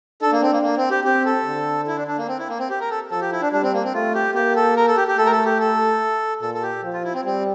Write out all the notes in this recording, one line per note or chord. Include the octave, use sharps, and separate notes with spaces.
D4 A4
A#3
C4
A#3
A#3
C4
G4
C4 G4
A4
D3
E4
D4
D4
A#3
C4
E4
A#3
C4
G4
A#4
A4
F3 A4
G4
E4
D4
G3 D4
C4
A#3
C4
A3 F4
G4
A#3 G4
A4
A#4
A4
G4
G4
A3 A4
A#4
A4
G4
A4
A#2 A4
A4
G4
F3
F4
E4
C4
G3 C4